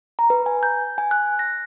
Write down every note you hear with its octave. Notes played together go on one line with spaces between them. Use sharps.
A#5
B4
G#5
G6
G#5
F#6
A#6